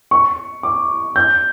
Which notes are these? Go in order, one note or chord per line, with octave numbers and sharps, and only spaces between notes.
C#6
D6
G6